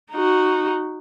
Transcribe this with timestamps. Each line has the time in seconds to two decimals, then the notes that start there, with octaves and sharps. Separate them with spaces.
0.11 D#4 F#4